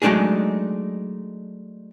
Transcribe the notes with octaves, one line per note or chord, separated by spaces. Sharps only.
F#3 G#3 A3 D4 D#4 G#4